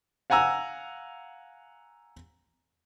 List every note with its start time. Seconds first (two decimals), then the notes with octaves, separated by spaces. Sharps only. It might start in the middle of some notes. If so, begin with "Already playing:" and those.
0.30 F5 F#5 G#5 A#5 E6